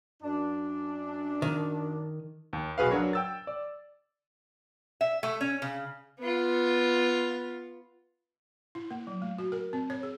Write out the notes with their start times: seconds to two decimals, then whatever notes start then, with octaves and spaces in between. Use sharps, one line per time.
0.22 F#2 D4
1.42 D#3
2.53 D#2
2.78 B1 F#4 G#4 B4 F5
2.91 F#3 D4 F#4 A#4 C#5
3.13 G5 E6 A6
3.47 D5
5.01 E5
5.23 A3
5.41 C#4
5.62 C#3
6.20 B3 F4
8.75 E4
8.91 A#3
9.07 F#3
9.22 A3
9.38 F#4
9.52 A#4
9.73 C4
9.90 C#5
10.03 G#4